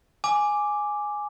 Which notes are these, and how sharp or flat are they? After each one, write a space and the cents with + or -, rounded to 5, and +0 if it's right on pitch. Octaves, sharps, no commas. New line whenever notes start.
G#5 +0 D6 +0